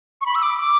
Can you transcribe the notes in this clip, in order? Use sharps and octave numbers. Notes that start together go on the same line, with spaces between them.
C#6
B5
E6
D6
D6